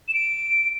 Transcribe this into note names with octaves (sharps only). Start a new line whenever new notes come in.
E7
D7